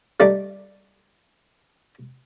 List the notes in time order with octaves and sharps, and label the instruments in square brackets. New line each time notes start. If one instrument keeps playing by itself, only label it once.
[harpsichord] G3 A3 D4 D#4